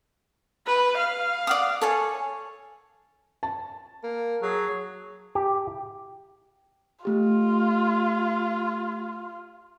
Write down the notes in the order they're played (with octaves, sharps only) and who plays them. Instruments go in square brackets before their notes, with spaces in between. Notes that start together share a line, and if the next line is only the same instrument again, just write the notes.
[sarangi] B4
F5
[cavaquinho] D5 F#5 D#6
A4 C#5 G#5
[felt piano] A5
[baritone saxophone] A#3
[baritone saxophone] F#3 [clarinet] G#4
[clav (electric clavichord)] G4
[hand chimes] A3 G4 [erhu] F4